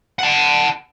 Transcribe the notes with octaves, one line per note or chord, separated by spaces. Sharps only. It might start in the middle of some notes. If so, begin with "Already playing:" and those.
F#5 A5